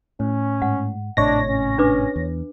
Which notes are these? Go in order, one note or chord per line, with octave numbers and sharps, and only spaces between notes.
A2 C#4
G#2 F#5
G#1 A2 C3 D4 C#5 D#5 A#6
C#4
D4 B4 D6
E2